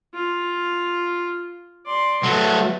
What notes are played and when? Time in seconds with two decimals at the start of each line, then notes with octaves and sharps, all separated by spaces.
0.14 F4
1.86 D5 C6
2.23 F#3 A3 B4